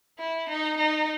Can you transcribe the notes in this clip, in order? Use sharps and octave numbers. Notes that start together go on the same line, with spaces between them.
E4
D#4
D#4